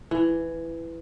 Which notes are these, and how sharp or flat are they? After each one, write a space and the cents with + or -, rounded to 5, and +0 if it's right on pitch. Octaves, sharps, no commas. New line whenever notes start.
E3 +10